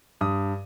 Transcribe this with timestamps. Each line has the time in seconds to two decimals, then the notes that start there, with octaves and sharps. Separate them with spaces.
0.21 G2 D#6